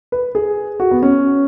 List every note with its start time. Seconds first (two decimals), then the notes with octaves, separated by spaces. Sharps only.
0.12 B4
0.35 G#4
0.80 F#4
0.91 B3
1.03 C#4